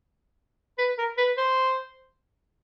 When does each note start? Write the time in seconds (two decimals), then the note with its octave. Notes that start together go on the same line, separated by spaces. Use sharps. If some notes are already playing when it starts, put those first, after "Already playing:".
0.78 B4
0.98 A#4
1.18 B4
1.38 C5